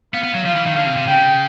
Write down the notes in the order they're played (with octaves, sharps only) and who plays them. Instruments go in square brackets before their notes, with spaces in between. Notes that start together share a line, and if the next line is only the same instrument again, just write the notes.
[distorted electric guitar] B3 [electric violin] F5
[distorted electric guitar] B3
F#3
[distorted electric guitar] F3 [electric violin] F5
[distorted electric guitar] E3
D#3
[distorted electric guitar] D3 [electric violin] F5
[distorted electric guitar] C3
C3
[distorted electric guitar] C#3 [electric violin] G5